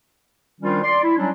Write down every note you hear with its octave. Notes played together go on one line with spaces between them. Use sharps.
D#3 F3 G3 C#4 D4 F4
D5 C6
E4
F#3 G3 C#4 D4